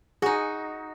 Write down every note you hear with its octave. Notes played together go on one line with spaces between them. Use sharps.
D#4 F#4 G#4